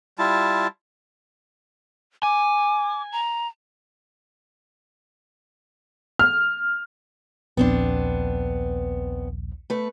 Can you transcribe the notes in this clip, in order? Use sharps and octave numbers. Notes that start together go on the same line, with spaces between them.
G3 E4 F4 A5
G#5 D6
A#5
F6
A#1 D#2 B3 C4 D4
A3 B4